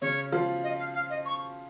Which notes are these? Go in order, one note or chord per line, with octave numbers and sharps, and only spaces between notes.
C#3 C#4 C#5
F3 F4
D#5
F5
F5
D#5
C#6